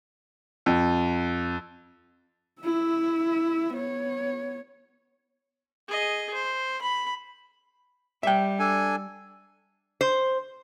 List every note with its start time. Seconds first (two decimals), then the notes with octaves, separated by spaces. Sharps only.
0.66 F2
2.62 E4 E5
3.75 B3 C#5
5.88 G#4 D#5
6.34 C5
6.82 B5
8.23 G3 E5 G5
8.59 D4 A4 G#5
10.01 C5